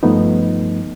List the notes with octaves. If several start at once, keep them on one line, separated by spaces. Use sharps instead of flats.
G2 F3 A3 B3 D#4